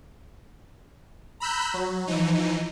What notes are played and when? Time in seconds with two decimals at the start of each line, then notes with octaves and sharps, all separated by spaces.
1.40 A#5 B5 E6 F#6 G6
1.74 F#3
2.07 E3 F3 D#4